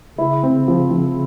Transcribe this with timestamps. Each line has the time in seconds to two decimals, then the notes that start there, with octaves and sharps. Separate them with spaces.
0.18 C#3 E4
0.43 C4
0.68 F3
0.91 F3